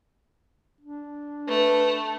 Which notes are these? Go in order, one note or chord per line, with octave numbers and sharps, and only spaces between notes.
D4
A3 B4